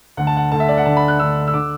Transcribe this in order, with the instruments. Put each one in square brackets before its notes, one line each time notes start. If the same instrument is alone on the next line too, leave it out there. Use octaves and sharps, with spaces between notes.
[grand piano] D2 D3 F#5
A5
F#5
D2 D3 A5
E5
D5
F#5
D2 D3 A5
B5
F#6
D2 D3 E6
E6
D3 D6